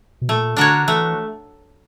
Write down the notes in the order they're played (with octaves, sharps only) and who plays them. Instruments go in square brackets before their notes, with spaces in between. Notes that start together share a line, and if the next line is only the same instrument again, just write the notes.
[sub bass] B2
[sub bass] A#2 [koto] A3
[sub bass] D3 [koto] D4 F#4 A#4 C#5
[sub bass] E3 [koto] A3